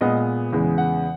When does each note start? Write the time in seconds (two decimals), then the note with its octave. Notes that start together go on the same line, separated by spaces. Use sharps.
0.01 A#2 G#3 B3 D#5
0.53 E2 C#3 G#3 B3
0.78 F#5